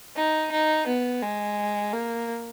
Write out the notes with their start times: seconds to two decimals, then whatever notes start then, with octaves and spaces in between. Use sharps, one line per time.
0.16 D#4
0.52 D#4
0.87 B3
1.22 G#3
1.93 A#3